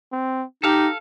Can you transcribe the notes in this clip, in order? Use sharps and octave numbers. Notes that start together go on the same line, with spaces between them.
C4
D#4 G4 A4 F5